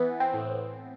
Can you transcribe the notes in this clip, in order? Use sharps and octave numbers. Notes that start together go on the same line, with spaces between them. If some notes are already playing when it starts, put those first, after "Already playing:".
Already playing: E3 B3
C4
A2